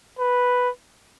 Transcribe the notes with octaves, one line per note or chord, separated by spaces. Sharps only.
B4